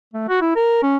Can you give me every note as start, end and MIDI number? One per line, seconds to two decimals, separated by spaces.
0.14 0.25 57
0.29 0.40 66
0.41 0.51 64
0.56 0.82 70
0.83 0.97 61